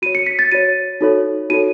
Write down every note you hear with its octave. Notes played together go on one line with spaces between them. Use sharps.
F#4 C#5 D#7
C#7
B6
A6
F#4 C#5 D#7
D#4 F#4 A4 C#5
D#4 F#4 A4 C#5 D#7